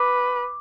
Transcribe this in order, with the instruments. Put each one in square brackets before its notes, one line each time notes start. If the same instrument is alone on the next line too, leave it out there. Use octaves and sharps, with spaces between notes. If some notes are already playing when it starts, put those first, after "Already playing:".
Already playing: [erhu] B4 [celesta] D6